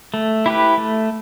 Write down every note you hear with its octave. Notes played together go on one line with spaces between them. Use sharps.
A3
E4 G4 B4
A3